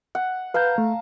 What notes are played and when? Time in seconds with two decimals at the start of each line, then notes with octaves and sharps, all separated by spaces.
0.15 F#5
0.54 B4 F5 A5 A#5 G6
0.78 A3